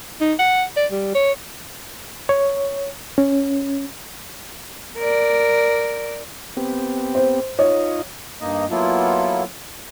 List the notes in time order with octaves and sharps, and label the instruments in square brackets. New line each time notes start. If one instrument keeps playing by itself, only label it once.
[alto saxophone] D#4
F#5
D5
G3
C#5
[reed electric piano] C#5
C#4
[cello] A#4 D5
[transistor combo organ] B3 C4 G4
[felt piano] C5
[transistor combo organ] D#4 F4 D#5 [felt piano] C#5
[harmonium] G2 A#3 D#4 D#5
F#3 A#3 B3 E4 F4 A4